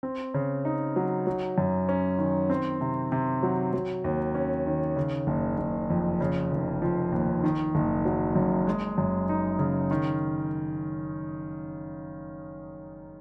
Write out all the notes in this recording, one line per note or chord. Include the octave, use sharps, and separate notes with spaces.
C4
C#3
D#4
F#3
F#3
F#2
C#4
D#3
C4
C3
C3
F#3
F#3
D#2
C#4
D#3
C#3
F#1
F#1
F2
C#3
F1
F3
D#2
D#3
F#1
F#3
F#2
G#3
F#2
D#4
C#3
D#3